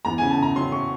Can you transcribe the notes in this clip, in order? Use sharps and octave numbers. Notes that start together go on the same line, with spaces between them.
E2 A#5
C#3 G#5
A5
C#3 A#5
F#3 C6
C#6